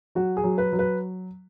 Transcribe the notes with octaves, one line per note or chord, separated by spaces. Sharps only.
F#3 F#4
G#4
F#3
B4
F#3
B4